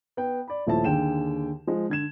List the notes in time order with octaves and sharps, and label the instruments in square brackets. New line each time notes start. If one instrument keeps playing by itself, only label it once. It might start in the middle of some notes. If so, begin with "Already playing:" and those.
[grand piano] B3 G5
D5 B5
D#1 F3 A3 E4 C#5 A5
D#2 D3 G#4 G5 E7
F3 G#3
D3 G#6 E7